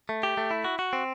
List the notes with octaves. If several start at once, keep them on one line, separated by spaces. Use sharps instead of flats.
A3
G4
A3
E4
F#4
F#4
C4